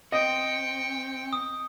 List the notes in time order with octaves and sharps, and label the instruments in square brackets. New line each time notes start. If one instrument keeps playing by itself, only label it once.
[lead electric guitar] C4 [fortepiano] D#5 [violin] G5 C#7
[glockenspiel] D#6